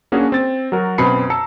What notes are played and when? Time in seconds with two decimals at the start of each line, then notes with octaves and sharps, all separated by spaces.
0.12 A#3 C#4 D4 F#4 G#4
0.32 C4 A6
0.72 F#3 F#4 A#4
0.98 F#2 B2 C4 B5 C7 C#7
1.30 A5 A#5 E6 C#7